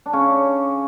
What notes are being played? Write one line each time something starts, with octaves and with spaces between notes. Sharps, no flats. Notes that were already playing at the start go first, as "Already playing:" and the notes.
D4
C#3 C#4